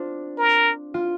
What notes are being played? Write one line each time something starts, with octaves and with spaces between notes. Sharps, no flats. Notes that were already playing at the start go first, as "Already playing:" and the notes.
Already playing: C4 D4 F4
A#4
F4